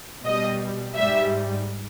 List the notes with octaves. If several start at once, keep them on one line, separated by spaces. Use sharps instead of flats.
B2 G3 D#5
G#2 G3 E5